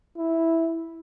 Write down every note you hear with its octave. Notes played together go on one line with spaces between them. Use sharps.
E4